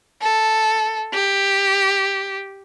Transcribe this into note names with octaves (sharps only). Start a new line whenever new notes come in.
A4
G4